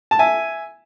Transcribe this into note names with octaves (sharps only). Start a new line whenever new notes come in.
A5
E5 G#5